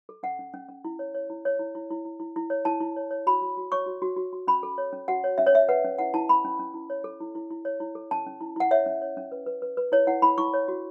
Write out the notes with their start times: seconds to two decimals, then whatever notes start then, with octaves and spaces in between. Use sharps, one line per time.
0.09 A4
0.23 C#4 F#5
0.39 C#4
0.54 C#4
0.68 C#4
0.85 E4
0.99 C#5
1.14 C#5
1.30 E4
1.45 C#5
1.59 E4
1.75 E4
1.90 E4
2.05 E4
2.20 E4
2.36 E4
2.50 C#5
2.65 E4 A5
2.80 E4
2.96 C#5
3.11 C#5
3.27 F#4 B5
3.42 F#4
3.57 F#4
3.72 C#5 C#6
3.86 F#4
4.02 F#4
4.17 F#4
4.33 F#4
4.47 C#4 B5
4.63 A4
4.78 C#5
4.93 C#4
5.08 F#4 F#5
5.24 C#5
5.38 C#4 E5
5.47 C#5
5.53 C#4 E5
5.69 B4 F#5
5.84 C#4
5.99 E4 F#5
6.14 E4 A5
6.29 C#4 B5
6.45 C#4
6.59 C#4
6.74 E4
6.90 C#5
7.04 A4
7.21 E4
7.35 E4
7.50 E4
7.65 C#5
7.80 E4
7.95 A4
8.11 C#4 A5
8.27 C#4
8.41 E4
8.56 E4 F#5
8.71 C#5 E5
8.86 C#4
9.02 C#5
9.17 C#4
9.32 B4
9.46 B4
9.62 B4
9.77 B4
9.92 E4 C#5
10.07 E4 F#5
10.22 E4 B5
10.38 E4 C#6
10.54 C#5
10.68 F#4